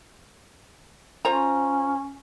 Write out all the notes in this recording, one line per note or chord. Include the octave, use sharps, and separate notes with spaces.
C#4 F4 C5 A#5